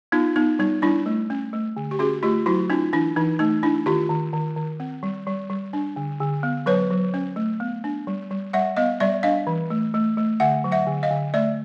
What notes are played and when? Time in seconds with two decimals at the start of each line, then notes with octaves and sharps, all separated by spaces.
0.12 B3 D#4 F4
0.36 B3 D#4
0.59 G3 D#4
0.82 G3 D4 E4
1.06 A3
1.30 C#4
1.53 A3
1.77 D3
1.91 G4
1.99 C#4 F#4 G#4
2.23 A3 F4 G4
2.46 F#3 E4 F#4
2.70 C#4 D#4 F4
2.93 E3 D4 E4
3.16 E3 D#4
3.39 A3 D#4
3.63 D4 E4
3.86 D#3 F4 G4
4.10 D#3
4.33 D#3
4.56 D#3
4.80 C4
5.03 G3
5.27 G3
5.50 G3
5.73 D4
5.96 D3
6.20 D3
6.43 B3
6.66 F#3 B4 C#5
6.90 F#3
7.14 C#4
7.36 A3
7.60 B3
7.84 D4
8.07 G3
8.30 G3
8.53 G3 E5 F#5
8.77 B3 D#5 F5
9.00 G3 D5 E5
9.23 D4 D#5 F5
9.47 E3
9.70 A3
9.94 A3
10.17 A3
10.40 D3 E5 F#5
10.64 F#3
10.72 E5 F#5
10.87 D3
11.03 D#5 F5
11.11 D3
11.34 A3 D5 E5